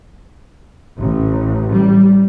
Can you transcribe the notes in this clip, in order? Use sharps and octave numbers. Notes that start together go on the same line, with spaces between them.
A1
G3